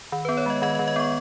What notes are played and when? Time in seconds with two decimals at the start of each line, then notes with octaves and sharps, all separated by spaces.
0.12 D#3
0.25 B4
0.29 B3
0.37 C#5
0.46 G#3 D#5
0.62 D#3 D#5
0.75 D#5
0.79 D#3
0.88 D#5
0.96 B3 C#6